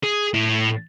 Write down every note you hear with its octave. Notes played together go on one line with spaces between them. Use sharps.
G#4
A2